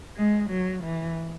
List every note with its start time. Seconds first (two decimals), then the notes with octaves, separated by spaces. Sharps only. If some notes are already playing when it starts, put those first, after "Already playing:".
0.17 G#3
0.50 F#3
0.84 E3